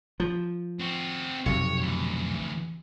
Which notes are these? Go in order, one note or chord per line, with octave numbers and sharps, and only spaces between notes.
F3
C4 F#4
B1 F2 C3 C#5
D2 E3